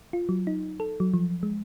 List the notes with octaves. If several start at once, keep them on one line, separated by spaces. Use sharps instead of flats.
F4
F#3
D#4
A4
F#3
F3
G#3